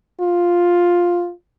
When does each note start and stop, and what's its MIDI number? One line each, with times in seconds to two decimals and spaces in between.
0.21 1.31 65